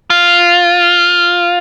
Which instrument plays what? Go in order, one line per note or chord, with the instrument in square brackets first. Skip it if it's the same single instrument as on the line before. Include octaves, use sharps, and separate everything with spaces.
[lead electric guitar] F4